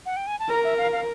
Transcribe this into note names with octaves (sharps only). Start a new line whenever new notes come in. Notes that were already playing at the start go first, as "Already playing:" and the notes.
F#5
G5
G#5
A5
A#4 A#5
E5
F5
F5